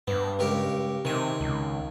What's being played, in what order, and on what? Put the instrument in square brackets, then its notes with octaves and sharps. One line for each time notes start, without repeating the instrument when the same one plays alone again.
[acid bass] G2 [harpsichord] B3
[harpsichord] C#2 G4 A#4
[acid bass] C3 [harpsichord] D#3 G#5
[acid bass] C#2